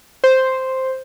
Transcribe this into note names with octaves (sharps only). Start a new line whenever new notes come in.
C5